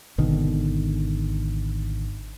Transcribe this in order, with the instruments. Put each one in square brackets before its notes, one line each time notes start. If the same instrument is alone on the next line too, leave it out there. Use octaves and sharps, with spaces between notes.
[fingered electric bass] G#1 B2 D3 D#3